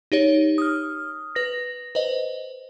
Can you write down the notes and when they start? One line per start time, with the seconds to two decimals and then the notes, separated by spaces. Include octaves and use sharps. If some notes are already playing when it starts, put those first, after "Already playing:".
0.12 D#4 G4 C#5
0.58 D#6 F6
1.35 B4 A#6
1.95 B4 C5 D#5